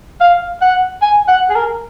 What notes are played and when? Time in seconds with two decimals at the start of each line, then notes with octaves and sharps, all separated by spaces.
0.21 F5
0.62 F#5
1.02 G#5
1.28 F#5
1.50 G#4
1.56 A#4